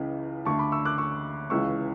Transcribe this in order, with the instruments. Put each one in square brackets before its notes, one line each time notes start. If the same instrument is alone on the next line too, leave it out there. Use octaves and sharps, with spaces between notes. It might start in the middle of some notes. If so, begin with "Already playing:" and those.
Already playing: [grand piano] C#2 C#3 E3
D2 D3 A5 C#6
B5 D6
C#6 E6
D6 F#6
C#6 E6
C#2 C#3 E3 C#6 E6